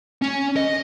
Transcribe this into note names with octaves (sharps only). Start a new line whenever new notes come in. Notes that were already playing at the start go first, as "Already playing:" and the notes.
C#4
D#5